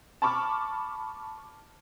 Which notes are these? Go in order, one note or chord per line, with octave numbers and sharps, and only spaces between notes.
A5 B5 C#6 D6 F6